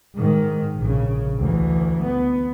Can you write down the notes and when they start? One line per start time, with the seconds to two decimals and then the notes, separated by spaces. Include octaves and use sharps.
0.15 G#2 D#3
0.77 A#1 C#3
1.39 D2 E3
2.03 B3